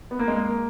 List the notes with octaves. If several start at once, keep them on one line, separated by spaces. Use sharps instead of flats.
B3
A#3
G#3
A#3